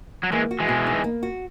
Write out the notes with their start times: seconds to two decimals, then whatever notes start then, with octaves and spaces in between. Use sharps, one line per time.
0.23 F#3
0.32 E3 G#3 A#3
0.51 F#4
0.60 E3 G#3
0.68 B2
0.87 D#4
1.04 A#3
1.23 F#4